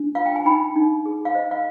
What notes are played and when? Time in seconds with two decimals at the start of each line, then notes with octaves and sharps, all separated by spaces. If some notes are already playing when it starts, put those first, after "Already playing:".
Already playing: D4
0.15 F4 F5
0.26 G5
0.36 G#5
0.45 D#4 G5 B5
0.76 D#4
1.06 G#4
1.25 F5
1.35 C5 D#5
1.51 F5